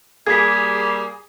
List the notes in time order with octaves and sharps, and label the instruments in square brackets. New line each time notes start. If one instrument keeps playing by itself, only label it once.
[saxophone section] G3 A#3 [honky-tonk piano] G#4 [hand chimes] G#6 B6